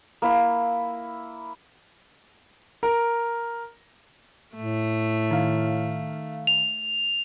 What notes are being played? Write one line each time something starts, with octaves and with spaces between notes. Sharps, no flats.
A#3 E4
A#4
A2 A3
D#3 F5
F7